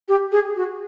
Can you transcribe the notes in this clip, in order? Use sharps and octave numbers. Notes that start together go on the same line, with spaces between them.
G4
G#4
F#4